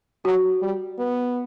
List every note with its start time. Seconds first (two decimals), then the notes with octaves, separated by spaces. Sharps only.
0.25 F#3 F#4
0.62 G3
0.99 B3